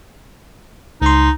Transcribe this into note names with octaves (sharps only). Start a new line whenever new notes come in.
C#2 D#4 C6